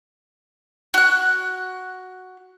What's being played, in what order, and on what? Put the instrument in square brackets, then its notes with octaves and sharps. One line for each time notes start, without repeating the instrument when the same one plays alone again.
[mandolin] F#4 F#6